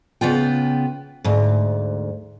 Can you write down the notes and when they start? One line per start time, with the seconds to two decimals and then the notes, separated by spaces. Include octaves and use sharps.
0.21 C#3 B3 F4 G5
1.24 D2 G#2